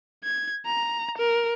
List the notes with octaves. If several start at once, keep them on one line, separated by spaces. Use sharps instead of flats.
G#6
A#5
A#4